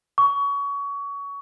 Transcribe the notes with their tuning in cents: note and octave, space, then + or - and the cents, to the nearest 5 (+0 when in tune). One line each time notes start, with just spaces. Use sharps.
C#6 +25